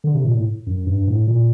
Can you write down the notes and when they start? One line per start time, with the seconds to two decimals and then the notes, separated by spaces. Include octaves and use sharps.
0.04 D3
0.15 C3
0.25 A#2
0.35 A2
0.67 F#2
0.87 G2
1.07 A2
1.27 A#2